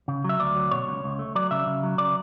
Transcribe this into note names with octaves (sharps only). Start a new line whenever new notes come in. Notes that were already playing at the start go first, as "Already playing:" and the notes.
C#3
F#3 E5
D2 D5
F#3
B2 C#5
C#2
C#2
A3
F#3 D5
C#3 E5
C#3
F#3
C#3 D5